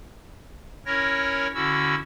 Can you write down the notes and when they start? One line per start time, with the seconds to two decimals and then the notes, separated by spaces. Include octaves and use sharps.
0.86 C#4 E4 A#4 C#5 A#6
1.54 D3 C#4 E4 F#4 E6